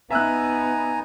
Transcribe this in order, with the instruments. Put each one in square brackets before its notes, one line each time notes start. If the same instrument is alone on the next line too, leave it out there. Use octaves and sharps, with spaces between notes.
[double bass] B3 D#4 [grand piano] E5 E6 F#6 [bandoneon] G#5 A#5